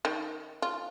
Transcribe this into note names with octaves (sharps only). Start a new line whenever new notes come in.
D#3
F4